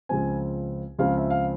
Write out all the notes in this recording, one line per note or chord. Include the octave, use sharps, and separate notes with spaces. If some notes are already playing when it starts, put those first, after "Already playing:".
C#2 C#3 F3 C4 G#5
C#2 C#3 F3 C4 F5
E5
F5